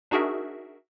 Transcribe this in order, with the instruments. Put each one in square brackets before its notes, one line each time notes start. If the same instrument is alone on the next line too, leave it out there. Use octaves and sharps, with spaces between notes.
[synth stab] D4 D#4 F#4 G#4 A#4 E5